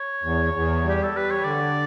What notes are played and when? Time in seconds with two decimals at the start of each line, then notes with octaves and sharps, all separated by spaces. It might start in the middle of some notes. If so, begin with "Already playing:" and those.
Already playing: C#5
0.23 E2
0.54 E2
0.84 G3
0.89 G4
1.03 A4
1.14 G3 B4
1.30 C#5
1.44 D3 D5